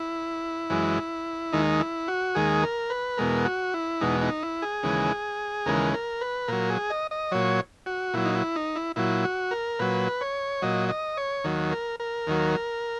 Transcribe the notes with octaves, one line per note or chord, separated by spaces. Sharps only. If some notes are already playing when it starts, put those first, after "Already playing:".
Already playing: E4
F#2 E3 G#3
D#2 D#3 G#3 D#4
E4
F#4
D#2 D#3 G#3 G#4
A#4
B4
E2 B2 G#3 A#4
F#4
E4
E2 B2 G#3 D#4
D#4
E4
G#4
D#2 C#3 E3 G#3
D#2 C#3 E3 G#3 A#4
A#4
B4
A#2 F#3 A#4
G#4
D#5
D#5
A#2 F#3 C#5
F#4
A#2 F#3 E4
D#4
E4
D#4
E4
A#2 F#3 E4
F#4
A#4
A#2 F#3 B4
C#5
A#2 F#3 D#5
D#5
C#5
D#2 D#3 F#3
A#4
A#4
D#2 D#3 F#3